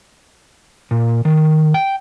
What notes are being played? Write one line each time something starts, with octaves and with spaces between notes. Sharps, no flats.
A#2
D#3
G5